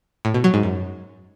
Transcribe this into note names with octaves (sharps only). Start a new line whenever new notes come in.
A2
B2
F#3
G#2
F#2